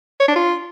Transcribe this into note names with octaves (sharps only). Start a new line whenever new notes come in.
C#5
D4
F4